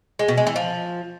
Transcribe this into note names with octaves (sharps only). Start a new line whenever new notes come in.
G#3
B2
G#3
E3
F3